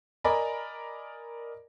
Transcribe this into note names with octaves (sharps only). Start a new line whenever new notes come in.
A#4 D5 D#5 G#5 A#5 B5